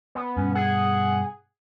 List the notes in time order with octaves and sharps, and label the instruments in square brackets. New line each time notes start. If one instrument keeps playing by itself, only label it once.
[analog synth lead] B3
[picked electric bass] G2 B2 [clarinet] C#4
[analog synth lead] G#4 [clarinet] F#5